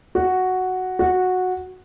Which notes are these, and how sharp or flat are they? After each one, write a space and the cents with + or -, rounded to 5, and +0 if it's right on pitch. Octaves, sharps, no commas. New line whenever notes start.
F#4 +0
F#4 -10